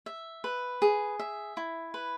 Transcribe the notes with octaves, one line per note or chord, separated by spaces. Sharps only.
E5
B4
G#4
E5
E4
B4